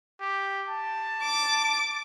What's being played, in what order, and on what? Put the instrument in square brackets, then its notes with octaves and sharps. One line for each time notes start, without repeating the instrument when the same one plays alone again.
[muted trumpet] G4
A5
[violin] D6